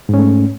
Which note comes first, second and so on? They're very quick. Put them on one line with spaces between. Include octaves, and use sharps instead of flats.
G#2 C#4 A3